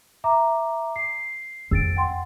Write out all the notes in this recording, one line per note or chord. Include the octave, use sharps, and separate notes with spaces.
E5 A#5 D6
C7
F2 E6 A6 D7
F#5 G5 C6